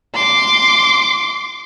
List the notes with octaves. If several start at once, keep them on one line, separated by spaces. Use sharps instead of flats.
C6 D6